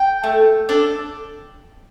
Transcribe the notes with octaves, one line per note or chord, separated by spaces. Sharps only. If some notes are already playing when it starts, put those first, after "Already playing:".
Already playing: G5
A3
D4 A4